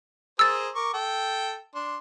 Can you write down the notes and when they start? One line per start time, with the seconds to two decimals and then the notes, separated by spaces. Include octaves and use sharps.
0.39 G#4 A#4 C5 E6 A6
0.75 A#4 C#6 D6
0.94 A4 G5
1.75 D4 C6